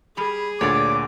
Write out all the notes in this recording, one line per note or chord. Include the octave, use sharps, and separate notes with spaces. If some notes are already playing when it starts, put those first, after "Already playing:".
G3 G4 G#4
D2 A#2 D3 C#5 D5 D6